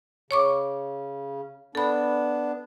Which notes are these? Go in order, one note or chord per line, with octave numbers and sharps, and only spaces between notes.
C#3 C#5 C#6 D6
B3 D4 A4 B5